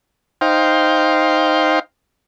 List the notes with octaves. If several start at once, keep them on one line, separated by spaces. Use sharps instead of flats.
D#4 C5 F5 G5